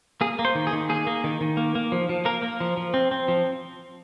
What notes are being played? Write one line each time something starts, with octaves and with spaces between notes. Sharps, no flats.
A#3 G#4
A#3
C5
D#3
G#4
D#3
A#3 G#4
A#3
D#3
D#3
A#3
A#3
F3
F3
A#3 A#4
A#3
F3
F3
C4
C4
F3